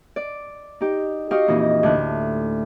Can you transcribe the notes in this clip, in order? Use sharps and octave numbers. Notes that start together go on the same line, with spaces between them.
D5
D#4 G4
F#4 G4 D#5 F5 C#6 D#6
F2 A#2 E3 D#4 D#5
D2 A2 F#6